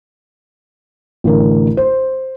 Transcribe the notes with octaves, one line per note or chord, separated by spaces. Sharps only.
A1 D3 A#4
C5